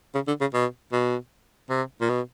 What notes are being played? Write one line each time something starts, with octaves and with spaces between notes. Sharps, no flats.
C#3
D3
C#3
B2
B2
C3
A#2
B2